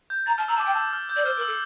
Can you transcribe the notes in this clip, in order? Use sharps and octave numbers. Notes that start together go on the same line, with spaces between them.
G6
A#5 A6
A5 F6
A#5 E6
A5 D6
G5
A5 E6
F6
G6
D5
C5 F6
A#4
E6
A4